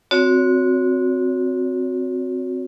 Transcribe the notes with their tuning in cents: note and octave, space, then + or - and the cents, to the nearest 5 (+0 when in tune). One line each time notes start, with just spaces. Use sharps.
C4 -5 F#4 -20 C#5 +25